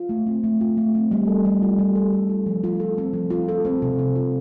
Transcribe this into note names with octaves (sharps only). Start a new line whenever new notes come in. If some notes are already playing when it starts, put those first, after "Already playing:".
Already playing: F4
A3
C4
A3
F4
A3
C4
G3
A4
G3
F4
G3
A4
G3
F4
F3
F4
A4
C4
F3
F4
A4
C4
C3
C4
F4